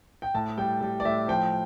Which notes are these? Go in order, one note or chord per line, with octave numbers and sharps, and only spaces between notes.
G5
A2 A5
G3 G5
G3
D5
A2 E5
F3 G5